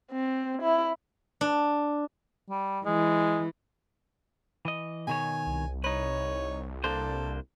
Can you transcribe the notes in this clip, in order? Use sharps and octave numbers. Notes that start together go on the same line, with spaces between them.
C4
E4
D4
G3
E3 G#3
E3 D#5
B2 D#3 C#5 G#5
C2
D#4 B4 C#5
A#3 D4 A4 C5